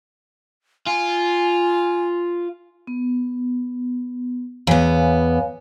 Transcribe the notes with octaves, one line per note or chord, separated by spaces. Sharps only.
F4 G#5
B3
E2 B3 C#5 F5 G#5